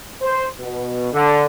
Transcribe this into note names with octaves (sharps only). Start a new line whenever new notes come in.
C5
B2
D3